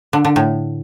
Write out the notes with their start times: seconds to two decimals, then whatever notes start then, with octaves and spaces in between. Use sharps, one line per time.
0.13 D3
0.25 D3
0.36 A2